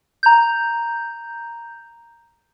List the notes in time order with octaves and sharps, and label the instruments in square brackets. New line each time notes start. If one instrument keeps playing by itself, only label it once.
[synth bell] A#5 G6